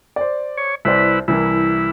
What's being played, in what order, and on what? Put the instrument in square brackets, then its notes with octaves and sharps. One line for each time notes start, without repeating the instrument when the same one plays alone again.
[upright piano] C5 D5
[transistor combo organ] C#5
[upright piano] C2 C5 D5 [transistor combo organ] E4 B4
[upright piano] C2 E3 A#4 [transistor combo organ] E4